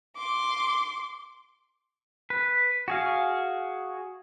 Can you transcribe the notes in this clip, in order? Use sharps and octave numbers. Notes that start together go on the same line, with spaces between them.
C6 D6
B4
F#4 G#4 F5